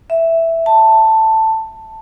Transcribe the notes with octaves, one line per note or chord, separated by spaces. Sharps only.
E5
A5